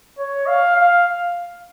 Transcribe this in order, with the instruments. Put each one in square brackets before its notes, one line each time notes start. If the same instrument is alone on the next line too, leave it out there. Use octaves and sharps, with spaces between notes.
[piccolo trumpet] C#5
F5
F5